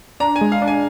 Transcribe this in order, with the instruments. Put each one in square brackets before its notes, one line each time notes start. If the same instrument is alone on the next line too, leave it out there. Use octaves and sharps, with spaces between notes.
[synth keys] D4 [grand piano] A#5
[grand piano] G#5
[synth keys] G#3
[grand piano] F5
[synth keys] D4
[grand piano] G#5